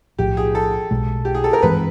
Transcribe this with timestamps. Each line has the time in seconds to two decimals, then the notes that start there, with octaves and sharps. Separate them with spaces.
0.19 B1 A2 F3 G4
0.37 G#4
0.55 A4
0.91 B1 B2 G#3
1.25 G4
1.35 G#4
1.44 A4
1.53 A#4
1.63 G2 E3 G#3 C4 B4